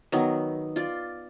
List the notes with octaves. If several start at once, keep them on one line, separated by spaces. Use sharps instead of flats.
D#3 F#3 B3
F4 D5